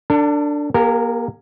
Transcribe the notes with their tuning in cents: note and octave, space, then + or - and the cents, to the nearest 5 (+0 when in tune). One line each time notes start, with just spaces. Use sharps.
D4 +0 A4 +40
A#3 +30 G4 +40 A#4 -20